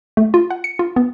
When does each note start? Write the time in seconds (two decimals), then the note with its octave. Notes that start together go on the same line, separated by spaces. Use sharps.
0.17 A3
0.34 F4
0.50 F#5
0.64 C#7
0.79 F4
0.96 B3